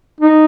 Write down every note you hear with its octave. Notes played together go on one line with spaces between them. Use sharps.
D#4